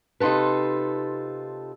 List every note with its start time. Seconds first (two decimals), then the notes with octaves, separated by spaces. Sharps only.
0.20 C3 D#4 F4 A4 B4